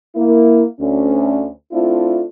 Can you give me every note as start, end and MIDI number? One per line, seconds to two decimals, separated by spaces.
0.16 0.63 58
0.16 0.63 64
0.78 1.48 38
0.78 1.48 61
1.73 2.24 57
1.73 2.24 60
1.73 2.24 62
1.73 2.24 64
1.73 2.24 65